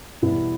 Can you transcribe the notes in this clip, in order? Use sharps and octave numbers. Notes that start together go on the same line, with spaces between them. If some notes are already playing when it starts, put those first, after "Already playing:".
E2 B2 G3 B3 E4